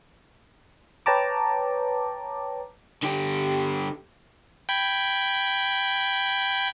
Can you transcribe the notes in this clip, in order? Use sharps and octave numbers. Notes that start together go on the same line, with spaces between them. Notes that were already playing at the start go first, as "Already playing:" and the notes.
B4 C#5 G5 A5 A#5 D6
D3 G4
G5 B5 G#6